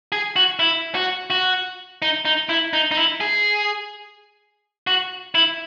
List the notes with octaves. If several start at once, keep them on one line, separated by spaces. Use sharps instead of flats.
G#4
F#4
E4
F#4
F#4
D#4
D#4
E4
D#4
D#4
E4
G#4
F#4
E4